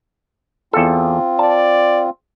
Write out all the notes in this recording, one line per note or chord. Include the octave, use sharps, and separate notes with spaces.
E2 C4 F4 A4
D5 A5